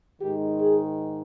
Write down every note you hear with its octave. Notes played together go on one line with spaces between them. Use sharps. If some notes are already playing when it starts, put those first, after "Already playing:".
G#2 D#3 G#3 D#4 G4
G#4